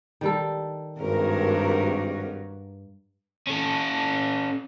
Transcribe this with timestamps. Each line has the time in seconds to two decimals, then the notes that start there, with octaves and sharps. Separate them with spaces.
0.21 D#3 G3 A4
1.00 G#1 G2 F#4 G4 A#4
3.47 C#4 A4